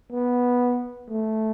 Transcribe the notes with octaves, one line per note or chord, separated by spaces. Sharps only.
B3
A3